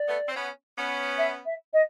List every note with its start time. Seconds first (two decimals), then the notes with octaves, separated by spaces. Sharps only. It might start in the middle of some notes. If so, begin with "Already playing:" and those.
Already playing: D5
0.08 A3 B3
0.28 C4
0.35 B3 C#4
0.76 B3 C#4
1.18 E5
1.46 E5
1.73 D#5